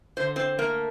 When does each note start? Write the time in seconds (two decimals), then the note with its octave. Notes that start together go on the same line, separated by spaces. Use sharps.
0.17 D3 C5
0.36 C4 C5
0.59 A3 A#3 A#4